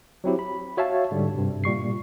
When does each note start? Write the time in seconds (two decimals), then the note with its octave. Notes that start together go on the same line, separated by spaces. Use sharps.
0.24 F#3 C4 E4 G4
0.39 B5
0.77 F#4 C#5 E5 F5 A5
1.11 G#2 D3 G3
1.34 G2 C3
1.64 A#2 G3 C#6 C7